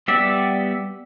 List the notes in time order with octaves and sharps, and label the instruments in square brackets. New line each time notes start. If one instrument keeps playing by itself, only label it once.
[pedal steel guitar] G3 B3 G4 D5 E5